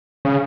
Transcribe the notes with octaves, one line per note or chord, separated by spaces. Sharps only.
C#3